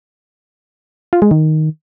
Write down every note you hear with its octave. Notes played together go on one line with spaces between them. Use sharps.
F4
G#3
D#3